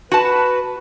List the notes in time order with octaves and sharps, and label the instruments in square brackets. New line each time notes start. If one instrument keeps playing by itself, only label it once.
[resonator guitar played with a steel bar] F#4 A5 [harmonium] B4